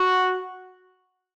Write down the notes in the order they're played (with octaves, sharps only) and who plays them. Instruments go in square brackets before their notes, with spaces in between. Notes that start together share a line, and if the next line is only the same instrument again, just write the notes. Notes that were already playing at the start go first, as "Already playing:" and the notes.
Already playing: [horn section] F#4